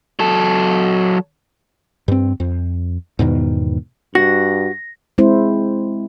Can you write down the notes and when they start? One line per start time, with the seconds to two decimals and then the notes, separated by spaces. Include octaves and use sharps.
0.19 F#3 A4
2.08 G2 C4
2.40 F2
3.19 E2 G#2 B2 D#3
4.15 G2 F#4 A#6
5.18 G#3 C4 E4 C5